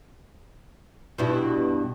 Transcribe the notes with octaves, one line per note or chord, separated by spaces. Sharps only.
G2 B2 E4